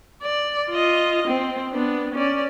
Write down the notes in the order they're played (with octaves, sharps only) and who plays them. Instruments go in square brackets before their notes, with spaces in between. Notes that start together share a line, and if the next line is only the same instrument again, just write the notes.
[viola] D5
F4 D#5
C4
B3 D4
C#4 D5